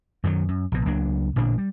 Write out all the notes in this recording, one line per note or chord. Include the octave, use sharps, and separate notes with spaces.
F#2 D#3 E3 F#3
F#2
A#1 B2
C#2 F#3 A#3 D4
A1 A#2 D3 D4
G3